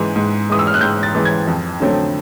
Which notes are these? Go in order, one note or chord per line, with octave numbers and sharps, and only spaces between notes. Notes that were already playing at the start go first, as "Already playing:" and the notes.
Already playing: G#2 E3 G#3
G#2
E3 G#3 D#6
E6
F6
F#6
G#2 G6
A6
E3 G#3
G#6
F2
D3 F#3 A3 C4